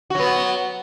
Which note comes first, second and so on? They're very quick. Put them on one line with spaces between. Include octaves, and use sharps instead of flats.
F#4 F#3 B3